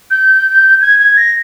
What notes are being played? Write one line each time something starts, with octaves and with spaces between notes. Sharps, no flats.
G6
G#6
G#6
A#6